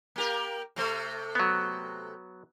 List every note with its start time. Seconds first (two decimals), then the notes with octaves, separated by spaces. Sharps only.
0.16 A#3 G4 A#4
0.76 C3 A3 C5
1.35 F#3 B3